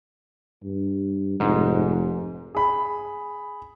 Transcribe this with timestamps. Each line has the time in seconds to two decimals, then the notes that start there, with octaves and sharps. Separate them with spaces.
0.64 G2
1.40 F1 G#2
2.55 G#4 B5